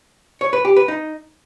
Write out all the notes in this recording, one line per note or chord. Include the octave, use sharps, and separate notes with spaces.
C#5
B4
G4
B4
D#4